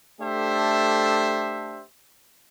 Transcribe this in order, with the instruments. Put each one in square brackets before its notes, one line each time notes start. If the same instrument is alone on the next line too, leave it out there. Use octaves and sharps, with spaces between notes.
[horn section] A3 D4 G4 A4 C5 E5